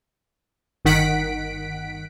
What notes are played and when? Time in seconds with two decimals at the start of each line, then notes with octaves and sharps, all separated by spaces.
0.85 G1 D#3 F#5 B6 D7